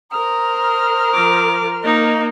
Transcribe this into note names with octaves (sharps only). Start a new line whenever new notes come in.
A#4 C5 A#5 D#6 F6
F3 D6
A#3 D#4 D#5